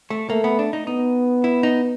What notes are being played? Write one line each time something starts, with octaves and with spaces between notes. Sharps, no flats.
A3
A3 A#3
B3
D4
D#4
B3 D#4
E4
D#4